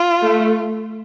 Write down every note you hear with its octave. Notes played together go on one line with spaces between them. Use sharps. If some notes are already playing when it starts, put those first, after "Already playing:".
Already playing: F4
A3